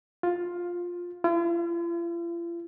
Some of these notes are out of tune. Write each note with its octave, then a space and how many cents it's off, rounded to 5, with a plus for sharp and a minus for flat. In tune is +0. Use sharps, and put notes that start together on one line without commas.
F4 +10
F4 -45